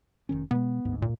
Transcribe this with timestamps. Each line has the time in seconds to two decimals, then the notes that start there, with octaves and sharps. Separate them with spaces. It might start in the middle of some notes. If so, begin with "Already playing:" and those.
0.29 F1 D#3 C#4
0.51 B2 G#3 B3
0.85 G1 D2 G#2
1.02 A#2